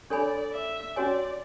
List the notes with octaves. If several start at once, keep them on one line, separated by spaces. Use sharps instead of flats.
D4 A4 C#5 D5 G#5 B5
E5
C#4 F#4 C#5 D5 G#5